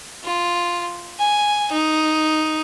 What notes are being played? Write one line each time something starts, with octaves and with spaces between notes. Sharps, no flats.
F4
G#5
D#4